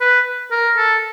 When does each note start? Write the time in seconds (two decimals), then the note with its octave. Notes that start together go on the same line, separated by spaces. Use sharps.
0.01 B4
0.52 A#4
0.77 A4